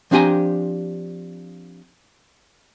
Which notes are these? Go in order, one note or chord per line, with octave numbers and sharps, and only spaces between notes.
F3 C4 D4 G4 G#5 A#5